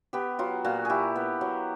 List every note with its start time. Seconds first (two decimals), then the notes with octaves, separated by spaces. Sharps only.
0.13 B3 G4
0.39 F#3 F4
0.65 A#2 F#4
0.85 E4 G4 G#4
1.16 B3
1.41 F#3